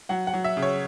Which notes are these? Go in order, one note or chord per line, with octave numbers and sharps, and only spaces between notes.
F#3 F#5
F#5
F#3
E5
C#3
C#5